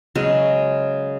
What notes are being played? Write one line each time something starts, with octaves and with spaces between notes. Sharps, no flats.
C#3 F#3 G#3